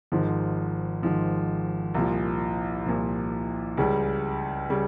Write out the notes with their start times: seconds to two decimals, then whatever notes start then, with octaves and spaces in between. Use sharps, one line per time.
0.12 G#1 G#2 F3
1.03 G#1 G#2 F3
1.94 C2 A#2 F3
2.86 C2 A#2 F3
3.77 C#2 C#3 G3
4.70 C#3 G3